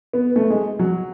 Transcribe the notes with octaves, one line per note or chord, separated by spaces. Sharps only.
B3
A3
G#3
F#3